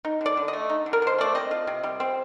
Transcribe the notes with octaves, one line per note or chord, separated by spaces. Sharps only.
D#4
D3 D5
D3
D#5
A3
D#4
D3
A#4
D3 C5
A3 D5
C4 D#5
F4
C3
G3
C4